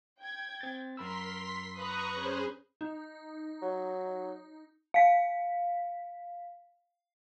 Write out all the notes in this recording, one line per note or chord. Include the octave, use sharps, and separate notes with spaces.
G5 G#6
C4 A6
F#2 A#4 B5 C6 E6 B6
B4 A#5 C#6 D#6 F#6
C#4 G#4 C5
D#4
F#3
F5 B6